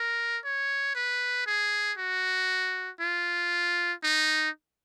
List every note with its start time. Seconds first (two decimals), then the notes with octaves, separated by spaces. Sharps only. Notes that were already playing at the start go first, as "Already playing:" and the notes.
Already playing: A#4
0.44 C#5
0.95 B4
1.46 G#4
1.98 F#4
3.00 F4
4.04 D#4